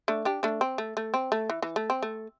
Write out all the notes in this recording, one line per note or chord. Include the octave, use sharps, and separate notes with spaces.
A3 D4
D4 G4
A3 D4
C4
A3
A3
C4
A3
E3
E3
A3
C4
A3